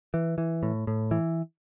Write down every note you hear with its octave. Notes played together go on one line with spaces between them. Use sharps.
E3
E3
A2
A2
E3